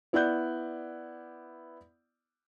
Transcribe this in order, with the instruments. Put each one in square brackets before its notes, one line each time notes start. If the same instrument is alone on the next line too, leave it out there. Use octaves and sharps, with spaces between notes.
[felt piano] B3 E4 D5 F#5 F#6 G6